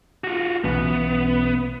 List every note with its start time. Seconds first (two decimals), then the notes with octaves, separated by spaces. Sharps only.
0.24 F4 F#4
0.64 B1 E3 B3 C#4